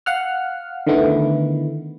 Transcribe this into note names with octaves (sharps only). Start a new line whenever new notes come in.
F5 F#5 F6
D3 D#3 A3 B3 E4